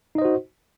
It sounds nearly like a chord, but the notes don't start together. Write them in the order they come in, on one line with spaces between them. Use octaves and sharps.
D#4 D#5 C5 F#4